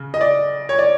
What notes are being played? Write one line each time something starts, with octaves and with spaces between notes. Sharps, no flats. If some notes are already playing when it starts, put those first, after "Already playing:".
Already playing: C#3
D#5
D5
C#5
D5